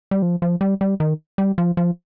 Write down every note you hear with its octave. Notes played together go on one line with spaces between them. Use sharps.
G3
F3
F3
G3
G3
D#3
G3
F3
F3